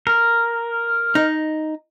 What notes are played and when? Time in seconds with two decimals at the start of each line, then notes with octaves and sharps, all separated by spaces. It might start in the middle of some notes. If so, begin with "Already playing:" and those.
0.07 A#4
1.15 D#4